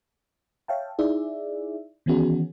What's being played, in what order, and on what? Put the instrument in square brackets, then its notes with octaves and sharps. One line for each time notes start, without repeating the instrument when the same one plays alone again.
[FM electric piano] C#5 E5 F5 G5 A5
D#4 E4 G#4 D5 E5
D#3 E3 B3 C#4 F#4 G#4